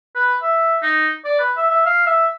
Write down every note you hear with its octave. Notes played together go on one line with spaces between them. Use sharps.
B4
E5
D#4
D5
B4
E5
E5
F5
E5